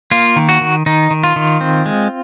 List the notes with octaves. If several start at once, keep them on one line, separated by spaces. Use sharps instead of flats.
A#3 F4
D#3
F#4
D#3
D#3 D#4
D#3
F4
D#3
C4
G#3